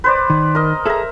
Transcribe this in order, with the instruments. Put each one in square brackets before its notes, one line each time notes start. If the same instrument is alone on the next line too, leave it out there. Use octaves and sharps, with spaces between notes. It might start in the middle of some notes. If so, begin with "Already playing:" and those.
[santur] B4 C5 D5
[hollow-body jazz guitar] D#3
[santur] A#4 D#5
[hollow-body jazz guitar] G#4 A4 [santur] E5 A#5